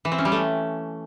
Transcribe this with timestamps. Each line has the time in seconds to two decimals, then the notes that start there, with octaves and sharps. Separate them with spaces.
0.05 E3
0.12 C4
0.18 C#4
0.25 G3
0.32 A3